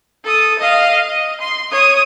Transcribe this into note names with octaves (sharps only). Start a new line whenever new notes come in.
A4 D#6
D#5 F5
D#5
C6
C#5 D#6